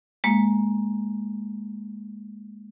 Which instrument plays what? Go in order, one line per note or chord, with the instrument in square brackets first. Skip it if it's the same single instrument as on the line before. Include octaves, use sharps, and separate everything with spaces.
[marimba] G#3 A#3